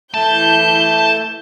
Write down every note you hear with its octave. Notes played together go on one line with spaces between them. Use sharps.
E3 A3 A5 G6